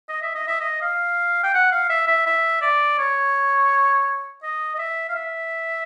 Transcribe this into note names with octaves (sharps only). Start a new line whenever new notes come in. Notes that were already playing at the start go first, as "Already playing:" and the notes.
D#5
E5
D#5
E5
D#5
F5
G5
F#5
F5
E5
E5
E5
D5
C#5
D#5
D#5
E5
F5
E5